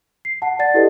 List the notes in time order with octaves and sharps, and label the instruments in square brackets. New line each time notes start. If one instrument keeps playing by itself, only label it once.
[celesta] C7
F#5 A5
D5 F#5 A6
E4 G4 A4 B4 D#5